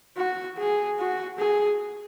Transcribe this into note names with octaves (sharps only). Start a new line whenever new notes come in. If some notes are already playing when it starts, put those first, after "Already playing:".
F#4
G#4
F#4
G#4